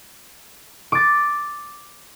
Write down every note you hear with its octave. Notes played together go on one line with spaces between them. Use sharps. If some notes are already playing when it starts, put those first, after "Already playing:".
D6 A6